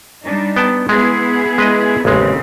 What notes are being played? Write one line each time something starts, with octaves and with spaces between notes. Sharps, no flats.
G3 D4 D#4
B3 G5 A5
G#3 B3 E4 G#4
G#3 B4 D#5
A1 D#2 C#3 G#3 C4